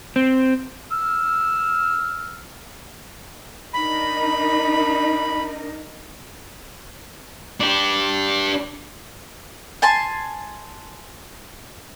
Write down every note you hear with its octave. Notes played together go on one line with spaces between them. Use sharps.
C4
E6 F6
D4 D#4 A#4 B5
D4 G4
G#5 A5 C6